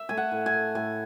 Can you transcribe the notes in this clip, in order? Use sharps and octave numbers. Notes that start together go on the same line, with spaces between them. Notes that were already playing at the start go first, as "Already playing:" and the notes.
Already playing: E5
A3 G#5
F#5
A2
G#5
A3
A2 G#5